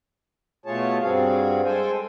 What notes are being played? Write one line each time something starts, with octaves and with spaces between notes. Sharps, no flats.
B2 A3 F4 G#4 C#5 A5
G2 G3 C4 F#4 G#4 F5
G#3 A4 C5 G5 G#5